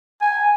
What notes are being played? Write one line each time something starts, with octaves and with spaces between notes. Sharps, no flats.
G#5